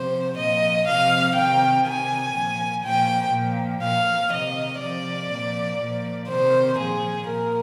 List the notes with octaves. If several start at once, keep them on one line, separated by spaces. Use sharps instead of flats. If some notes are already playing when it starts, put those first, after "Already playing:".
Already playing: C3 F3 C5
A#2 F3 D#5
C3 F3 F5
C3 D#3 G5
C3 D#3 G#5
A#2 F3
A#2 F3 G5
A#2 F3
A#2 F3 F5
C3 D#3 D#5
C3 F3 D5
A#2 F3
A#2 F3
C3 D#3 C5
A#2 F3 G#4
A#2 A#4